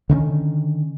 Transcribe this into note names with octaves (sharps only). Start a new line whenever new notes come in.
D3 D#3 B3 C#4